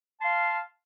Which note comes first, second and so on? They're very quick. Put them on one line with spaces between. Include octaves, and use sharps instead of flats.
A5 C6 F5